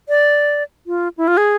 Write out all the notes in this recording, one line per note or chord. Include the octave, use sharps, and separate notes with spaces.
D5
F4
E4
F4
G#4